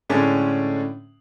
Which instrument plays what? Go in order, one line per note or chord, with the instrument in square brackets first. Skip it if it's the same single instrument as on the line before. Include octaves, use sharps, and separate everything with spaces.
[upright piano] A2 D3 G#3 C#4 D4